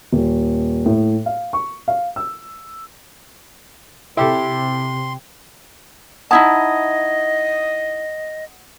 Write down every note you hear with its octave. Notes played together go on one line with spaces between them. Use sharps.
D#1
A2
F5
C#6
F5
E6
C3 E4 G4 A4 G5 C6
D#4 E4 D#5 F#5 A5 D#6 G#6